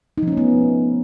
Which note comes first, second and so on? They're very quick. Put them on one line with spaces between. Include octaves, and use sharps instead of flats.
D#4 F3 C#4 A3 B3